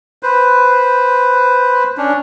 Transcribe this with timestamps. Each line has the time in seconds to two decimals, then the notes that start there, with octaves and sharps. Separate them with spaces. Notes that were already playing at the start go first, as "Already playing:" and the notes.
0.23 B4 C5
1.97 C#4 D4